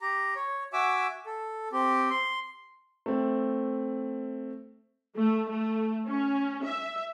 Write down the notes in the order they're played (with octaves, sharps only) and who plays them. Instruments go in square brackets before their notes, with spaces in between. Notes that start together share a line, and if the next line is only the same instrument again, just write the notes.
[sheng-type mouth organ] G4 A#5
C#5
F#4 E5 G#5 D6 E6
A4
C4 G4
C6
[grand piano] A3 C4
[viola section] A3
A3
C#4
E5